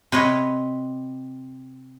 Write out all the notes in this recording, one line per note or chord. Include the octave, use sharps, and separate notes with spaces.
C3 B4 C#5 D#5